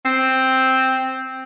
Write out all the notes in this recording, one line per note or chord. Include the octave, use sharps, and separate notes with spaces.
C4